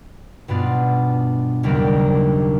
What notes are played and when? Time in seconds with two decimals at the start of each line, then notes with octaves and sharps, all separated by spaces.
0.48 G2 B2 B3 D4 F4
1.63 F#1 D#2 G3 D4 A#4